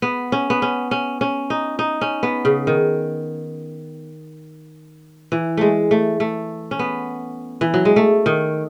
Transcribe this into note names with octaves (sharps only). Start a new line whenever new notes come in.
B3
C#4
B3
C#4
C#4
C#4
D#4
D#4
C#4
B3
C#3
D#3
E3
G#3 A3
A3
A3
C#4
B3
E3
F#3
G#3
A3
D#3